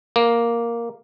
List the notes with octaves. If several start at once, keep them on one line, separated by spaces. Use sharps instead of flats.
A#3